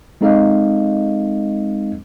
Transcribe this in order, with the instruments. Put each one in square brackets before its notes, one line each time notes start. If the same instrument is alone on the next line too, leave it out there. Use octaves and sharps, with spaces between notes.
[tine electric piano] G#3 C4 D#4 A4 D#5 F5